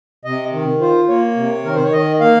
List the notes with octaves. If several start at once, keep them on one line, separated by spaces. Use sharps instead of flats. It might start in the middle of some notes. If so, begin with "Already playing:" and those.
C3 D#5
D#3
F4 C5
A#3 C#5
C3
D#3 A#4
C5
C#5
D#3 D#5
A#3 F5